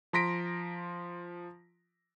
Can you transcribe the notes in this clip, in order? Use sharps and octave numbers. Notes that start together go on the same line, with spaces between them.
F3 A#5 C6 A#6 B6 D7